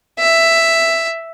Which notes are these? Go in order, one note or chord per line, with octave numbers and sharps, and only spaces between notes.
E5